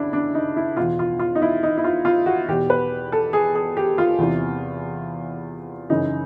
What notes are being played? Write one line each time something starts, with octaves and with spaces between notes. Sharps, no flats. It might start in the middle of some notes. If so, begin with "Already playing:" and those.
Already playing: D2 C#3 D4 E4
D4
D#4
E4
E2 B2 F4
F4
F4
D#4
E4
D#4
E4
F4
F4
F#4
E2 B2 G4
B4
A4
G#4
G#4
G4
F4
E2 C3 E3
F#2 C#3 E3 D#4